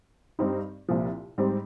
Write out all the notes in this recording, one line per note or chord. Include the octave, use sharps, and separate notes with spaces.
G2 G3 C4 D#4
C2 A#2 F3
G#2 G3 C4